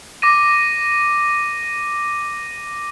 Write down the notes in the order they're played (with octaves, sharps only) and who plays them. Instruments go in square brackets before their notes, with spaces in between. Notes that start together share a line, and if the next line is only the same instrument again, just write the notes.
[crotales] D6 A#6 D#7